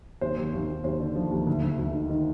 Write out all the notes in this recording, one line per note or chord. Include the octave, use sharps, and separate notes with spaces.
D#2 C5
D#2
D#2
D#2
D#2 C5
D3
F3
D#2
D2
D2
D2
D#3
D#3